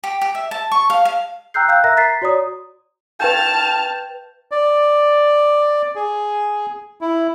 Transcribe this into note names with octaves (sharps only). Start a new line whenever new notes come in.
G4
G4
E5
A5
C#6
F5
F5
G5 A#5 E6 F#6 G6 C7
F5 E6 F#6 G6
A#4 E5 A#5 F#6 A#6
A#5 A6 B6 C7
F#4 C#5 D5 A#5 D#6
B4 G5 A5 F6 G6
D5
G#4
E4